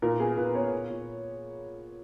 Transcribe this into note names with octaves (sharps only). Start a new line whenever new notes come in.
A#2 A#4
B3 G#4
A#2 B4
B3 C#5
A#2
A#2